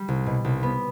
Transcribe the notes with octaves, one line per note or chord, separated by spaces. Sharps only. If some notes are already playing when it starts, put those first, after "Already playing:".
Already playing: G3
C2
B2
C2
B3